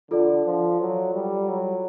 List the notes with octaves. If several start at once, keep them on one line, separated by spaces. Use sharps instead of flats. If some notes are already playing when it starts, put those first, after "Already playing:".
D3 F4 A4 D5
F3
F#3
G3
F#3